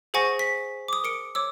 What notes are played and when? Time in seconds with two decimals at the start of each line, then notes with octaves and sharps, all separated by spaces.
0.14 G#4 C5 F#5 G#5 C#6 A#6
0.39 B6
0.88 D6 D#6
1.04 A#4 C#7 D7
1.35 C#5 D6 E6